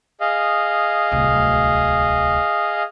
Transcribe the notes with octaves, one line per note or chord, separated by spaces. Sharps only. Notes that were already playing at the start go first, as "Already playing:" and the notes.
G#4 D#5 F5
D1 C2